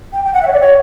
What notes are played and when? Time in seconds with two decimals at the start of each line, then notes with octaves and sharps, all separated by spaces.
0.13 G5
0.25 G5
0.34 F#5
0.42 E5
0.47 C#5
0.52 D5
0.61 C#5